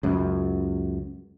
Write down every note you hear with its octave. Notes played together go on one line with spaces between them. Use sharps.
C#2 F#2